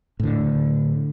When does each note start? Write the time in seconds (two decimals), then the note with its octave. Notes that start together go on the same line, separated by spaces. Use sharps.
0.20 A2 D3